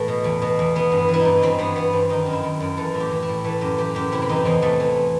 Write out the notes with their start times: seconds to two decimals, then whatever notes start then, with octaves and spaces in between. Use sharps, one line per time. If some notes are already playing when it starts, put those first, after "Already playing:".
Already playing: A2 E3 A3
0.08 B2
0.24 E2
0.42 B2
0.59 E2
0.75 E3 B3
0.92 G2
0.97 B3
1.09 E3 E4
1.20 D#4
1.25 G2
1.42 E3 C4
1.58 G2 B3
1.76 E3 B3
1.93 G2 C4
2.10 D#3 D#4
2.26 F#2
2.33 E4
2.43 D#3
2.60 F#2
2.77 E3 A4
2.94 A2
3.00 G4
3.11 E3
3.22 E4
3.29 A2
3.44 E3 A3
3.61 F#2 G4
3.78 E3 G4
3.95 F#2 G4
4.12 C3 E4
4.22 C4
4.29 E3 D#4
4.45 E2 C4
4.62 E2 A3
4.80 E3